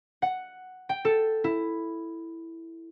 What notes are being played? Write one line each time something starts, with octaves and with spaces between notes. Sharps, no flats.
F#5
G5
A4
E4